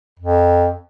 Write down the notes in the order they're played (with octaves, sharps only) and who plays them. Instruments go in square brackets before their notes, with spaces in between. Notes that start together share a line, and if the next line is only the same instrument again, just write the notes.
[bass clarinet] F2